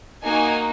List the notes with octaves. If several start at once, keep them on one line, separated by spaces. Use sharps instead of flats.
A#3 D#4 F#4 G#5